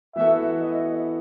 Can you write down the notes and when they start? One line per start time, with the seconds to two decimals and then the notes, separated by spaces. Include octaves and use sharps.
0.16 E3 B3 F#4 A4 E5
0.61 D#5